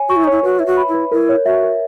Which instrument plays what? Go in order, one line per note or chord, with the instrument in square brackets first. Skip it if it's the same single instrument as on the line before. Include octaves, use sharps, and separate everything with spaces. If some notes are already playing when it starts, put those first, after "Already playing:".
Already playing: [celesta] C#5 G#5
[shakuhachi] F#4 [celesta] C#6
[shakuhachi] E4
D#4
[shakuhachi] E4 [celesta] C#5
[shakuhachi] F#4 [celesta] B4
[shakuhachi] E4 [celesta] E5
[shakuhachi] F#4
[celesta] B5
[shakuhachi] E4
[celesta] B4
[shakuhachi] E4 [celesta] A#4
[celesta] C#5
[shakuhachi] F#4 [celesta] E5
[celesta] A#4